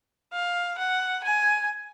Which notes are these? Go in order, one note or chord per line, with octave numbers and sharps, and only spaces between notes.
F5
F#5
G#5